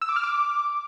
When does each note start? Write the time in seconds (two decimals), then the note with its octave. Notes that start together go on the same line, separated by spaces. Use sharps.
0.02 E6
0.09 D6
0.16 F6
0.23 D6